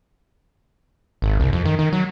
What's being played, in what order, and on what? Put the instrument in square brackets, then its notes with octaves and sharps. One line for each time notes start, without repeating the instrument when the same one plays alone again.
[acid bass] G#1
C2
F2
D#3
D#3
F#3